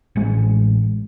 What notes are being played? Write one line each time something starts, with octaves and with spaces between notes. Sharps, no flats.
A1 G#3